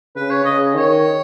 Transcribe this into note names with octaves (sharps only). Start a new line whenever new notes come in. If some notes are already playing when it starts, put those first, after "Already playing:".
C#3 B4
C#5
C#3 D#5
D#3 C#5